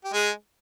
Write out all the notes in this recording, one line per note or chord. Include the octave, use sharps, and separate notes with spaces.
G4
G#3 G#4